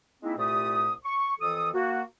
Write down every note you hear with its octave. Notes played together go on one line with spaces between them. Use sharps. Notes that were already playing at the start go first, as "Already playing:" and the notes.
G#3 A#3 C4 D#4 E4
C2 A#2 A3 G4 D#6
C#6
F2 E3 A4 D#6
A#3 F#4